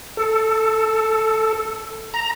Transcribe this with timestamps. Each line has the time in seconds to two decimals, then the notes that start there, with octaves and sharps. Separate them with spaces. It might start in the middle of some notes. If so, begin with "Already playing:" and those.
0.17 A4
2.14 A#5